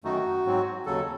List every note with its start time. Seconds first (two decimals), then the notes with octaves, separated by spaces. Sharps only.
0.04 F#2 D#3 A3 D#4 F#4
0.45 G#2 F#3 C4
0.86 D#2 C#3 F#3 A4